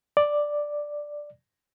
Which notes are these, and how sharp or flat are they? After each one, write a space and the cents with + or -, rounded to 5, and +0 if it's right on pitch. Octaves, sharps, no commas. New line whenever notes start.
D5 +5